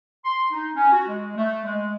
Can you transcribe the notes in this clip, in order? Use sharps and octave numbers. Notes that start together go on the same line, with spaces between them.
C6
D#4
C#4
F#4
G#3
A3
G#3